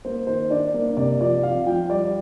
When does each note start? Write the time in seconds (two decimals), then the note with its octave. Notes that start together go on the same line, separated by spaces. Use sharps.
0.05 A#3 C5
0.27 D#3 C5
0.50 D4 D5
0.74 A#3
0.97 C3 D5
1.21 F3 D5
1.43 F3 F5
1.66 F3 G5
1.89 G3 D5